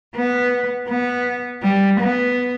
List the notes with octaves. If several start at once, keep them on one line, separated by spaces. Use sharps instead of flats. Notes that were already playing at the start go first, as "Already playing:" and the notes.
B3
B3
G3
B3